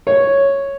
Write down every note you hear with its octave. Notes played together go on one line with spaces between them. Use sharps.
C#5